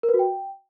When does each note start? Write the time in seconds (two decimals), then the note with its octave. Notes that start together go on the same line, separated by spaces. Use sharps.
0.03 A#4
0.09 B4
0.14 F#4
0.19 G5